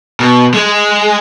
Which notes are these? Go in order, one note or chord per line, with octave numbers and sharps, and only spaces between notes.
B2
G#3